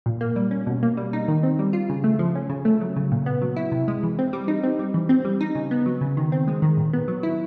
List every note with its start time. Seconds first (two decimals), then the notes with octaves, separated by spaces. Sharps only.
0.06 A#2
0.21 A#3
0.36 G3
0.51 C#4
0.67 B2
0.83 A#3
0.97 G3
1.13 D#4
1.28 D#3
1.43 C4
1.59 G3
1.73 F4
1.89 C#3
2.04 A3
2.19 F3
2.35 C#4
2.50 C#3
2.65 A3
2.81 F#3
2.97 C#3
3.12 A#2
3.26 B3
3.42 F#3
3.56 E4
3.72 C3
3.88 G#3
4.03 E3
4.19 C4
4.33 G3
4.48 D#4
4.63 C4
4.79 G3
4.94 E3
5.09 C4
5.25 G3
5.41 D#4
5.55 C#3
5.71 B3
5.86 F#3
6.01 C#3
6.17 D#3
6.32 C4
6.47 G#3
6.62 D#3
6.77 A#2
6.93 B3
7.08 F#3
7.23 E4